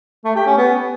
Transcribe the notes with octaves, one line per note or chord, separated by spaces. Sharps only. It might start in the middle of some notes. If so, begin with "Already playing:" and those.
A3
G4
C#4
B3